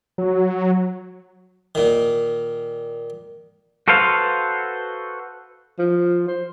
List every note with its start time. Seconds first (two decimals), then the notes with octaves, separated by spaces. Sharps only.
0.18 F#3
1.75 A#2 D#3
3.88 F#4 A4 B4 C5 F5
5.79 F3
6.28 C5